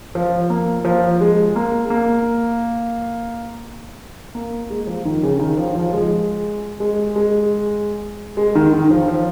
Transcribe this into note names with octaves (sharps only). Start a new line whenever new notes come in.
F3
A#3
F3
G#3
A#3
A#3
A#3
G#3
F3
D#3
C#3
D#3
F3
F3
G#3
G#3
G#3
G#3
D#3
D#3
F3
F3